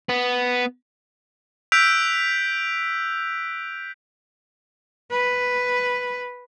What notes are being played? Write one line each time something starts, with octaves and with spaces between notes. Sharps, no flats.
B3
E6 F#6 G6 B6 D7 F7
B4